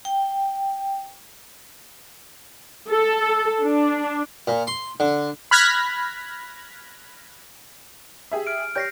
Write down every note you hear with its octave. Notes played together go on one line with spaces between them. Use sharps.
G5
A4
D4
A#2
C6
D3
B5 F6 F#6 G#6 A#6 B6
G4 G#4 E5
F6 D7
G4 C#5 G6 A#6 C7